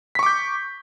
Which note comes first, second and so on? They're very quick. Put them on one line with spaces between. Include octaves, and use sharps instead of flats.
B6 C#6 D6 G6